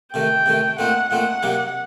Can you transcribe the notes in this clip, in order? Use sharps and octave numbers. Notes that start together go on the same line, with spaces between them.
C3 D#3 A3 G5
C3 D#3 A3
A#2 A3 C4 D#4 F#5
A#2 A3 C4 D#4 F#5
C3 F#3 A#3 D#4 G4